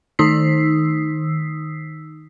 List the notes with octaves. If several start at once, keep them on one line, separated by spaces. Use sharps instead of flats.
D#3 D#4 D#6 E6 B6 C7